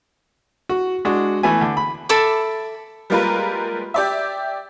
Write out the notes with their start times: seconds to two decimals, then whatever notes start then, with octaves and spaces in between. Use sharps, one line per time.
0.69 F#4
1.05 G#3 D4 F#4
1.43 E3 A3 B3 B4 E5 G#5
1.61 D3
1.77 B5
2.09 A4 E5 B5 D6
3.10 G3 G#3 A#3 F4 A#4 B4
3.94 G4 D5 E5